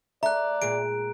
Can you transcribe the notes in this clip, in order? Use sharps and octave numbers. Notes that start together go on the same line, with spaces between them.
A3 D5 E5 A#5 F#6
A#2 G#3 D7